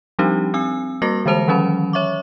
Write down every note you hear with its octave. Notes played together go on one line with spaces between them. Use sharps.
F3 G3 C4 D4 D#4 G4
C4 G#5 E6
G3 A#3 F#4 A#4 D6 A#6
D3 E3 G#3 C5 A5 F7
D#3 E3 F#3 C#4 B5
C#5 E5 C#6 D6